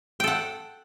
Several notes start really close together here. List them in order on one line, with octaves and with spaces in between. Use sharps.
G5 A4 F#5